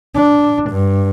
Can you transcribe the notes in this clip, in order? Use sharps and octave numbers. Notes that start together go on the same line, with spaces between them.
D4
G2